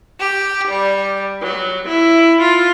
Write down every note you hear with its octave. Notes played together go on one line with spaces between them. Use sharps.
G4
G3
F#3
E4
F4